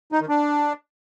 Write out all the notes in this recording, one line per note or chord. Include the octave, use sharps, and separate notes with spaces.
D#4
D#3
D4